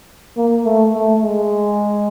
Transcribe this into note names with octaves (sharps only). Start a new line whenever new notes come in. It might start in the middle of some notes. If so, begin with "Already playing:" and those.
A#3
A3
A3
G#3